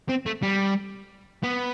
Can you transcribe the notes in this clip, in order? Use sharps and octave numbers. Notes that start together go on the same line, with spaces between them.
C4
A3
G3
B3